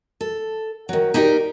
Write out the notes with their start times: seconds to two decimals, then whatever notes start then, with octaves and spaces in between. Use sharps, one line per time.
0.21 A4
0.89 D#3 F#3
1.14 D#4 E4 G4 A4 A#4 D5